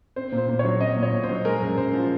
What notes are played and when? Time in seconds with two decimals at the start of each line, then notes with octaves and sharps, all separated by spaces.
0.16 C4 C5
0.32 A#2
0.38 C5
0.48 A#2
0.59 C#5
0.65 F#3
0.80 C4 D#5
0.96 A#2
1.03 C#5
1.13 A#2
1.24 C5
1.29 F#3
1.45 G#3 A#4
1.62 F#2
1.77 F#2 C5
1.94 F3